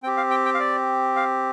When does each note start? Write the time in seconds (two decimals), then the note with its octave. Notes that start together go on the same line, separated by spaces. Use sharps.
0.03 C4 G5
0.07 G4
0.17 F5
0.31 G5
0.45 G5
0.54 F5
0.60 D5
1.16 F5